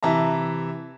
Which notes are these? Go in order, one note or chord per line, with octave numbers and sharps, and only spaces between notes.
C3 E3 E5 A5 A#5